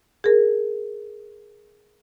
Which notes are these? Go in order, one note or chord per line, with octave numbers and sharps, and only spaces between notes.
G#4 A#4